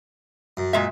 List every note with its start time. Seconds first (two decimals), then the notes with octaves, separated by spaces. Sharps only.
0.57 F#2
0.73 A#2 G#3 E5